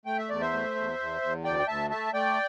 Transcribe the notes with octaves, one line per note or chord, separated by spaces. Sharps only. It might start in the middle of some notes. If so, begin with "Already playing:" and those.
A3 G5
E5
E2 D5
C5 E5
A3
E2
E2
E2
D2 D5 G5
G5
D2 E5 A5
A3 E5 A5
A3 D5 G5